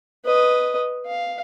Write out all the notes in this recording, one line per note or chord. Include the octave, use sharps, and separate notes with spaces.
B4 D#5
F5